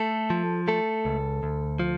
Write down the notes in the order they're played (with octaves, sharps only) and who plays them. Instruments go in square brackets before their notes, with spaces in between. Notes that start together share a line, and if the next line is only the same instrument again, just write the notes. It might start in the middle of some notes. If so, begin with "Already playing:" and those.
Already playing: [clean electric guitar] A3 A4
F3
A3 A4
C#2
D2
F3